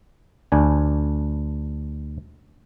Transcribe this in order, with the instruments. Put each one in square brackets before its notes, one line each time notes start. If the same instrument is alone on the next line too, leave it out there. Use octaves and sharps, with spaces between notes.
[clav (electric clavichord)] D2 D4 G#5